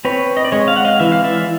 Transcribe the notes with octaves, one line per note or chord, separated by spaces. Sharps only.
C4 B4 C#5
D#5
D5
G#3 C#5 D#5
F5
F#5
D#5 F5
E3 E5
F5
D5 E5